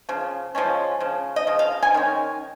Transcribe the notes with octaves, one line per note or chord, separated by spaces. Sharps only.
C#3 F3
C#3 F3 G#3 C#4
C#3 F3
D#5
C#3 F3
F5
G#5
D#3 G#3 C#4